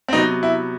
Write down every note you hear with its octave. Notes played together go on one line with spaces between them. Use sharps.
C4
C3 F#3 B3 D#4
E4